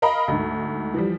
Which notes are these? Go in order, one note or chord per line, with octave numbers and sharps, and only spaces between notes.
A#4 D#5 F5 A#5 B5
D2 G#2
E3 F3 G3